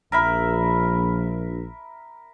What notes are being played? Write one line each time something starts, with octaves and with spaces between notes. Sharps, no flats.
A#1 A#4 E5 B5